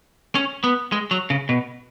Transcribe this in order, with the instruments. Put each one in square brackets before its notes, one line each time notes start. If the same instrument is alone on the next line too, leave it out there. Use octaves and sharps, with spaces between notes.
[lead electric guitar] C#4
B3
G#3
F#3
C#3
B2